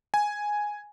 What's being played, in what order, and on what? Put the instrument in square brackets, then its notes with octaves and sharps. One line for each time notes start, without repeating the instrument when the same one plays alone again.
[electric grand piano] G#5